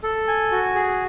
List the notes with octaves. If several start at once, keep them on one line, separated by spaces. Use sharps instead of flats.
A4
G#5
F#4
G#4